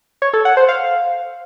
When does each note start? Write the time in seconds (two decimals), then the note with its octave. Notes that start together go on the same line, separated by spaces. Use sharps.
0.22 C#5
0.34 A4
0.45 F#5
0.57 C5
0.69 F5